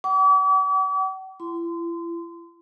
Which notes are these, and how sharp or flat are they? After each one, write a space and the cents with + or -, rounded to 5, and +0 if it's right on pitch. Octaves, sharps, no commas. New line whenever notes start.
F#5 +45 D6 -45
E4 +40 C6 -25